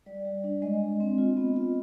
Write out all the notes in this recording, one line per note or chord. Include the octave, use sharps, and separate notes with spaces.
G3 D5
G3
D4
G#3 D#5
G#3
C4
F4
B3
F4